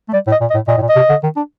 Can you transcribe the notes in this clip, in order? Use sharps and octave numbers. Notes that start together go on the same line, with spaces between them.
A3
G3 D5
A2
D#5
A#2
D#5
A2
A#2 D#5
A2
A#2
D#5
C3
D3
D#3
D4